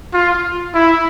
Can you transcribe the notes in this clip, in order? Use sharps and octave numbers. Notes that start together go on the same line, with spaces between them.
F4
E4